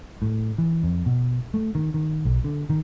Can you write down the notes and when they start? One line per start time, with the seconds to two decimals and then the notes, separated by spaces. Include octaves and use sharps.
0.22 A2
0.58 E3
0.84 F2
1.06 B2
1.54 A3
1.75 D#3
1.94 D#3
2.25 B1
2.44 D3
2.70 D#3